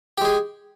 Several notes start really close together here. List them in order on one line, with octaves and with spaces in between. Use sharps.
G4 G#3 G#4